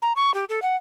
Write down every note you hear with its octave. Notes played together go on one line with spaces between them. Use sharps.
A#5
C#6
G4
A4
F#5